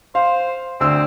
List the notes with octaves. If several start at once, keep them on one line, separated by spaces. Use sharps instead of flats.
C5 F5
D2 C4 E6